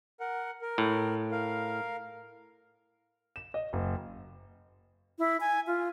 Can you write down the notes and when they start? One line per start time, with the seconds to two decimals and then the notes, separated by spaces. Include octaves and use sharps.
0.20 A#4 F#5
0.62 A#4
0.78 A2
1.32 A#4 F5
3.36 E7
3.54 D#5
3.73 F#1
5.19 E4
5.41 G#5
5.67 F4